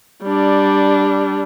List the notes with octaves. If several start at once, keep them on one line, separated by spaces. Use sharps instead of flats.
G3 D4